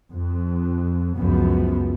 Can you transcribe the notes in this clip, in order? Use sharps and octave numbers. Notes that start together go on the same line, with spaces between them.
F2
C#2 F#2 F3 B3